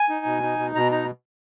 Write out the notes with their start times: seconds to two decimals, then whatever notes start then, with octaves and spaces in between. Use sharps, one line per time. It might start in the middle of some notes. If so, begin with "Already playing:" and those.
Already playing: G#5
0.09 D#4
0.26 B2
0.42 D#4
0.59 B2
0.75 B2 A#5
0.92 D#4 A#5